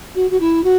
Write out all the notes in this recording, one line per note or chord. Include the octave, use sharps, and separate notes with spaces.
F#4
F#4
E4
F#4